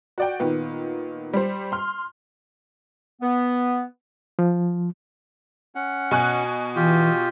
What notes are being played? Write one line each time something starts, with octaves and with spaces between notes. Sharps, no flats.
F#4 D5 G5
A#2 D#3 B3
G3 C5
C6 F6
B3
F3
C#4 F#5
B2 G#5 F#6
E3 F4 G4